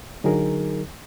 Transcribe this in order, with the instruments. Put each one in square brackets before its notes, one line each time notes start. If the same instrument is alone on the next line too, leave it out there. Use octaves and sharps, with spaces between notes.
[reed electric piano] D3 F#3 D#4 G#4 A#4